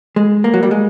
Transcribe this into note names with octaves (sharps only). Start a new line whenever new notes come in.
G#3
A#3
F#3
G3
G#3